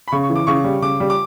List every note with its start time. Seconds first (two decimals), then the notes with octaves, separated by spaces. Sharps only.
0.08 B5
0.12 C#3 C#6
0.23 C#6
0.30 E3
0.36 D6
0.47 C#3 C#6
0.64 G3
0.82 C#3 D6
1.00 G3
1.10 D6